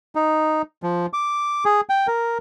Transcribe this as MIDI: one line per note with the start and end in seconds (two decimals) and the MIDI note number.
0.15 0.62 63
0.83 1.06 53
1.13 1.64 86
1.65 1.81 68
1.89 2.07 79
2.07 2.38 70